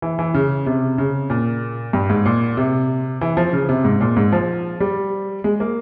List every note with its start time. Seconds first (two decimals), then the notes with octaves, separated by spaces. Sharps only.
0.02 E3
0.19 E3
0.34 C#3
0.66 C3
0.98 C#3
1.30 A#2
1.93 G2
2.10 G#2
2.25 A#2
2.57 C3
3.21 E3
3.37 F3
3.53 C#3
3.69 C3
3.84 G#2
4.01 A#2
4.17 G#2
4.32 F3
4.80 G3
5.44 G#3
5.60 A#3